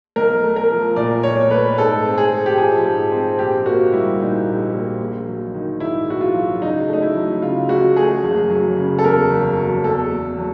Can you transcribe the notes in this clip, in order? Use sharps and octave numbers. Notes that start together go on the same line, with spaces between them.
B1 A#4
A3
A#4
F3
A#2 D5
B1 C#5
A3 B4
G#2 A4
C4
G#4
G#3
G4
F3 G#4
G#2
C4
A#1 G4
A#3 F#4
G3 E4
A#2 D#4
A#1
A#3
A#1
F#3
D#3
G#2 E4
A#1 F#4
F4
F#3
C#2 D#4
A3 D#4
E4
F#3
C#3 F4
C#2 F#4
A3 G#4
F#1
F#3
C#3
A4
E2 A#4
F#1
F#3
E2 A4
E2
F#3